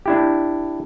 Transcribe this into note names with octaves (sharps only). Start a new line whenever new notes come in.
D4 E4 G4